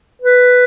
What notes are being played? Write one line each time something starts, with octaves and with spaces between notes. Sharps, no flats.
B4